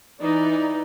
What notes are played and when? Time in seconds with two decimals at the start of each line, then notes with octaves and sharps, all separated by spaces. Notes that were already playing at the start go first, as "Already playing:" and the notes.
0.20 E3 D#4 D5